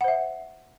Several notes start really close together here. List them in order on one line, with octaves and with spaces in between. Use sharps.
F#5 C5 E5